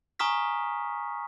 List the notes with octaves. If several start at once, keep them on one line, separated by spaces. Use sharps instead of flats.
G#5 A#5 C#6 D#6 F6 B6